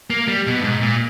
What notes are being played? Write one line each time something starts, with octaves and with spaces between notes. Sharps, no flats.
A#3
G3
B2
G2
G#2
A#2